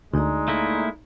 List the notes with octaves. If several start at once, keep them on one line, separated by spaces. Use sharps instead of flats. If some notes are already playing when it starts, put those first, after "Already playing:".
D2 G#3 D#4 D5 A#5
A3 A#3 E4